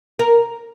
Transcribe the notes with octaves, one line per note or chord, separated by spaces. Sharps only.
A#4